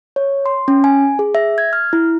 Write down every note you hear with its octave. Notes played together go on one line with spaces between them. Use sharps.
C#5
C6
C#4
G#5
G#4
E5
G#6
F6
E4